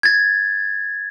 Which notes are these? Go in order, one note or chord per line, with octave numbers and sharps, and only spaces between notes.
G#6 A6